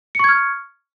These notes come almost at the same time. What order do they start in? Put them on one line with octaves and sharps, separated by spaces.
C#7 C#6 G#6 F6